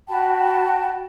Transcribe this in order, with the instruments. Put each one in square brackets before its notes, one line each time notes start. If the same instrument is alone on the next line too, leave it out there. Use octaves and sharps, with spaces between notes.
[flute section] F#4 G5 A5 B5